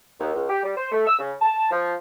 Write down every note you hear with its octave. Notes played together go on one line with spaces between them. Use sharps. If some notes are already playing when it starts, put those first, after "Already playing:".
D#2
C#2
G4
G3
C5
A3
E6
C#3
A5
F3